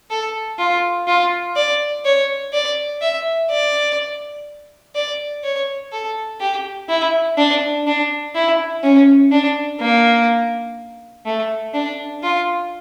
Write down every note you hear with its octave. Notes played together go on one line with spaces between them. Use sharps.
A4
F4
F4
D5
C#5
D5
E5
D5
D5
C#5
A4
G4
E4
D4
D4
E4
C#4
D4
A#3
A3
D4
F4